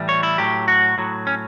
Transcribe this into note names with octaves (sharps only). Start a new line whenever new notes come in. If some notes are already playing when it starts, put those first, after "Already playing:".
Already playing: A2 E3 G3
C#5
E4
A2 F#3 G4
F#4
A2 F#3
C#4